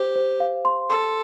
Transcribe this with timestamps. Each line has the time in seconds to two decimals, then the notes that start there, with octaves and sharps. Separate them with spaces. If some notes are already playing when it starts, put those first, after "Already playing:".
Already playing: G4 C5
0.16 C5
0.40 F5
0.65 C6
0.89 A4 C6